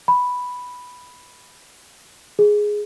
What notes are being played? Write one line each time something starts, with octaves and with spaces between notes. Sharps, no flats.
B5
G#4